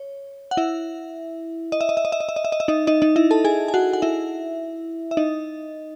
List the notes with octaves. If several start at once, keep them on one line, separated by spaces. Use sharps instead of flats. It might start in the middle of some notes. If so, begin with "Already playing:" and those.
Already playing: C#5
F#5
E4 E5
D#5
E5
D#5
E5
D#5
E5
D#5
E5
D#5
E5
D#5
E5
D#4 D#5
D#4 D#5
D#4 D#5
E4 E5
A4 A5
G#4 G#5
G#5
F#4 F#5
F#5
E4 E5
E5
D#4 D#5